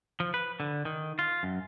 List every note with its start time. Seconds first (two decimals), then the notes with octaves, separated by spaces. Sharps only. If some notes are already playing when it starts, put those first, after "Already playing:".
0.20 F3
0.34 B4
0.60 D3
0.85 D#3
1.19 F4
1.43 F#2